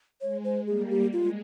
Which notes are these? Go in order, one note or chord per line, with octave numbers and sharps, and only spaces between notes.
G#3 C#5
C5
G3 A#3 G#4
G4
G#3 F4